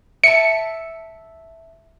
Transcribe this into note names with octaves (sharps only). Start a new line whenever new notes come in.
E5 A5 C#7